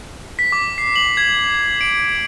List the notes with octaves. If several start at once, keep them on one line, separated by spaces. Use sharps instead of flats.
B6
D6
C7
F#7
G#6
D7